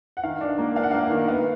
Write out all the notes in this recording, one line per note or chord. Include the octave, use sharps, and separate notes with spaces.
F#5
D#3 F5
D4
A#3
D4 F5
F#5
A#3 F5
D#3
B3 F5